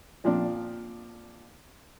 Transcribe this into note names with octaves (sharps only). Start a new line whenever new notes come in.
A#2 F3 C4 D4